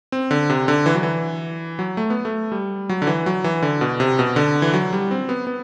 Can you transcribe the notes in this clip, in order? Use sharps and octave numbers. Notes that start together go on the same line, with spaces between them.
C4
D3
C3
D3
E3
F#3
E3
F#3
A3
B3
A3
G3
F#3
D3
E3
F#3
E3
D3
B2
C3
B2
D3
E3
F#3
G3
C4
B3
B3